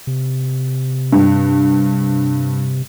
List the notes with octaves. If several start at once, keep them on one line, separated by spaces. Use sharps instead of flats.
C3
G2